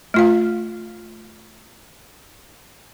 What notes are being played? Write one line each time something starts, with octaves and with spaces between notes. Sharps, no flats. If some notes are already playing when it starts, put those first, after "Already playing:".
A3 F4 F5